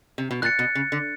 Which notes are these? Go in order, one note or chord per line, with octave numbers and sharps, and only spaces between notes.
C3
B2
A#2 F#6 A6 C#7
B2
C#3
D3